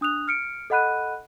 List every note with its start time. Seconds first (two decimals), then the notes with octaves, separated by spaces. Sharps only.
0.01 D4 D#6 F#6 F7
0.28 F6 C#7 D7
0.70 A4 D#5 F#5 B5 F#6 D#7